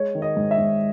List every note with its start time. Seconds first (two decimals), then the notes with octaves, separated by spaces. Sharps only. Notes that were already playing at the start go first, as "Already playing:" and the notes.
Already playing: G#3 C#5
0.15 D#3
0.22 D#5
0.37 G#2
0.51 E5
0.58 G#2